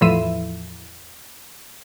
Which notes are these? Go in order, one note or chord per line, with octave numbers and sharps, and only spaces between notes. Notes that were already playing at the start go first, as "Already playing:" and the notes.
E2 A2 E3 F3 E5 D#7